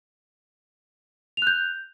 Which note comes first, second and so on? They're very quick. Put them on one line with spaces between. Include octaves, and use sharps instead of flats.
F7 F#6 G6